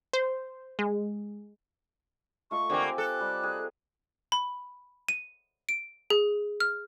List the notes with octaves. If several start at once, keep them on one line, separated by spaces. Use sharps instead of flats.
C5
G#3
A3 F4 D#5 C#6
D3 A#3 C4 G4 G#5
A4 F#6
G3
G#4 A#4
B5
D#7
D7
G#4
F6